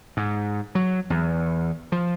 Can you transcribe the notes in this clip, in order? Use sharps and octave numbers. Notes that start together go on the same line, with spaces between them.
G#2
F#3
E2
F3